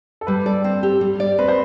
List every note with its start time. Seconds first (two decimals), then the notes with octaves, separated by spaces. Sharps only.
0.21 A4
0.27 G3 B4
0.46 A4 D5
0.64 C4
0.83 G4
1.01 G3
1.20 D5
1.38 C4 B4
1.48 C5